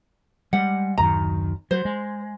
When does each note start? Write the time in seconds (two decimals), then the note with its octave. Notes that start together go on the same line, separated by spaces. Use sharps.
0.53 G3 G#3 F#5
0.98 D1 F#2 D#3 A#5
1.71 F#3 C5
1.85 G#3